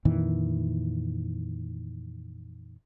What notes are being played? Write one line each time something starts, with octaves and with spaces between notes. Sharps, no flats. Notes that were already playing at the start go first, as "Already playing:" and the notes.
F2 A#2 D#3 E3